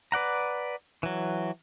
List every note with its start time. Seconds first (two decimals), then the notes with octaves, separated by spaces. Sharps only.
0.12 B4 D5 F#5 A#5
1.03 E3 F#3